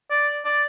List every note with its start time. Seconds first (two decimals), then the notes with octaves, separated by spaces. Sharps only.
0.10 D5
0.45 D5